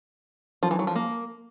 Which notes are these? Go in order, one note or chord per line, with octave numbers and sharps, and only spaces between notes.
F3
E3
F#3
F3
A#3